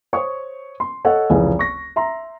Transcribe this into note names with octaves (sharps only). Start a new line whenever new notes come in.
C5 C#5 C#6 D#6
C6
A4 C#5 D#5 F#5
F1 C#2 E3 G#4
C#6 A#6
E5 A#5 C6